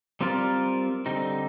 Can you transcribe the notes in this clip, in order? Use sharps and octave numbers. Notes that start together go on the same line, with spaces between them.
G3 C4 F4 A#4 D5
D3 G3 C4 D#4